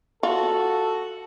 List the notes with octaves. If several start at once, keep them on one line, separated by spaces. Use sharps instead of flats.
F4 F#4 A4